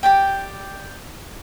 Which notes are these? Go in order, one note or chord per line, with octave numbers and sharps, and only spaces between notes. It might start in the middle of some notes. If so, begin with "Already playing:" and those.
G4 D5 G5